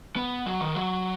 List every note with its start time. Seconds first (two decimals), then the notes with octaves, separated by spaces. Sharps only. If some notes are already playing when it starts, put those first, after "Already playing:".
0.16 B3
0.46 F#3
0.61 D#3
0.74 F#3